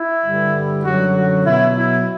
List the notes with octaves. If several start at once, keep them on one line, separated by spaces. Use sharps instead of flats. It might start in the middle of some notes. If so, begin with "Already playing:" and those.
Already playing: E4
G2 D3 G3
F#2 D3 F#3 F#4
F#4
B2 F#3 E4
E4